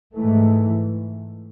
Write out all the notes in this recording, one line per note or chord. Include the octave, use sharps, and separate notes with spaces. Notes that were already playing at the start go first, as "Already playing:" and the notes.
G#2 E3 A3